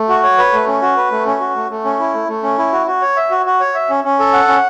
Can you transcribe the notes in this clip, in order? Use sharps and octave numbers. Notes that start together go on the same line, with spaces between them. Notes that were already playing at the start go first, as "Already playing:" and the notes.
Already playing: A3
F#4
C#5
B4
A3
C#4
F#4
B4
A3
C#4
F#4
A3
A3
C#4
E4
A3
A3
C#4
E4
F#4
F#4
C#5
E5
F#4
F#4
C#5
E5
C#4
C#4
A4
F#5
C#4